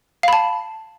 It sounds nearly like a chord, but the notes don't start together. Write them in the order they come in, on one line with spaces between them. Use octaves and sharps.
F5 B5 A5